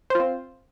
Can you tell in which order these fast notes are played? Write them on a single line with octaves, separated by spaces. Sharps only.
C5 F4 C4